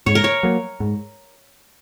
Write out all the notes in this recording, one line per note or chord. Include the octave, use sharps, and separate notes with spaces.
G#2 C#5
A#4
C#5
F#3 A#3
G#2